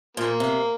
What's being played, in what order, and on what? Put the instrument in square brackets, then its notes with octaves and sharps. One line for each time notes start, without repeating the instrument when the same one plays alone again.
[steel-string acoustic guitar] A#2 [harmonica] F3 A#3
[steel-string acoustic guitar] C3